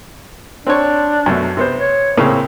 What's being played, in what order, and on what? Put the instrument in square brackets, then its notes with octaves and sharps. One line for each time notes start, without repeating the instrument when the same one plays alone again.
[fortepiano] C4 C#5 [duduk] D4
[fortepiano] F#2 B2 A3
C3 B3 C5
[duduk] C#5
[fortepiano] A2 C#3 A#3 [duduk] C4